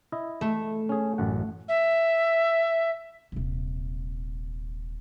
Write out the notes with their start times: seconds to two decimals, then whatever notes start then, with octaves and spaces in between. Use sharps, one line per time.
0.12 E4 D#5
0.41 A3
0.89 C#4 G#4
1.18 A1 F#2 F#5
1.68 E5
3.32 D#1 C3